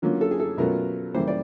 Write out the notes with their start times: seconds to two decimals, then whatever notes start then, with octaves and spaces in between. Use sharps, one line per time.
0.02 D3 F#3 A#3 C#4 F4
0.21 A4
0.31 G#4
0.40 A4
0.57 B2 F#3 A3 C#4 F4 A#4
1.14 C#3 E3 G3 A#3 C5
1.28 D5